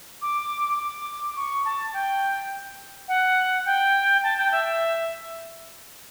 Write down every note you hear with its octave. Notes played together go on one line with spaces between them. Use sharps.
D6
D6
C#6
A5
G5
F#5
G5
A5
G5
E5